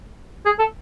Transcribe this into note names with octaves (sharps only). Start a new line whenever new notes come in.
G#4
A4